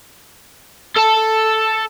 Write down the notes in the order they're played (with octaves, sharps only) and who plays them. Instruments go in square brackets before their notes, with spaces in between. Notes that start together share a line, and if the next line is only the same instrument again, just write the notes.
[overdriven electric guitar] A4 A5